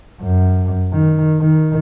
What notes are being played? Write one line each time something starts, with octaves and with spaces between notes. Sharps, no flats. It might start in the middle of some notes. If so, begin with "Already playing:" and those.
F#2
D#3
D#3